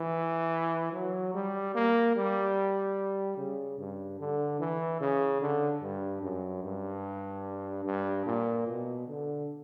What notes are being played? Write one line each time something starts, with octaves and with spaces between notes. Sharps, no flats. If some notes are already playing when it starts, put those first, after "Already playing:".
Already playing: E3
F#3
G3
A#3
G3
C#3
G2
D3
E3
C#3
D3
G2
F#2
G2
G2
A#2
B2
D3